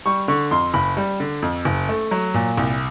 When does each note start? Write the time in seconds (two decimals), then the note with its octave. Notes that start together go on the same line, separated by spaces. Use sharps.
0.06 G3 C#6
0.28 D3 C#6
0.51 F2 C6
0.74 F#1 B5
0.97 G3
1.20 D3
1.42 F2
1.65 F#1
1.89 A3
2.11 F#3
2.34 A#2
2.57 C2